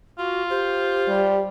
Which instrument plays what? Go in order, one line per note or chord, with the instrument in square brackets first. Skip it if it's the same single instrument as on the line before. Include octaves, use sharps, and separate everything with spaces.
[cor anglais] F4 [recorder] F#4
[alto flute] G4 [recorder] C5
[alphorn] G3